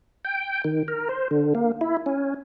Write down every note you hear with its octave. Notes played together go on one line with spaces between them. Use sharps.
G5
D#3
A#4
C5
D3
A#3
E4
C#4